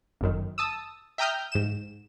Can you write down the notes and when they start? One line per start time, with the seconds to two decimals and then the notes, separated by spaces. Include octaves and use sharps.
0.21 G1 F#2 D#3
0.58 A5 D#6 E6
1.18 E5 G5 A#5 D#6 F6 G6
1.52 G#2 E7